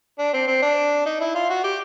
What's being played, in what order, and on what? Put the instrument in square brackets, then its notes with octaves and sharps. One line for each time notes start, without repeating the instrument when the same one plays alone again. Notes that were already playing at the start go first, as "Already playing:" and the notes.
[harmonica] D4
C4
C4
D4
D#4
E4
F4
F#4
G4